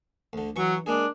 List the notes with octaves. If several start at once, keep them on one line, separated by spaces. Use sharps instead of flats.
D2 D3
E3 F#3 C#6
G#3 A#3 D4 G#4